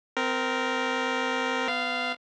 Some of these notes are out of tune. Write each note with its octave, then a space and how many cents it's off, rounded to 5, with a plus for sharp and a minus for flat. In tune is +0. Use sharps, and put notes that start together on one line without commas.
C4 -20 A#4 +0
B3 +25 F5 -10